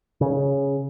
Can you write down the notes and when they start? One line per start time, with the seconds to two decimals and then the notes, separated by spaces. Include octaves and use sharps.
0.21 C#3